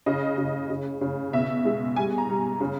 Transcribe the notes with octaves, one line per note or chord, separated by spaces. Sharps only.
C#3 D#5
C#3
C#3
C#3
B2 E5
G#3
G3 G#5
A#5
G3
C#3